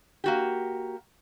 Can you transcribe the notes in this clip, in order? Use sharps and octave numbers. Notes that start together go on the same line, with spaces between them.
A#3 F#4 G4